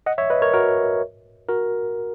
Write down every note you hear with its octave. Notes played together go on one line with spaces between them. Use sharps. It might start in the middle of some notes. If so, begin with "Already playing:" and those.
D#5 F#5
C#5 E5
B4 D#5
A#4 C#5
F#4 A#4
F#4 A#4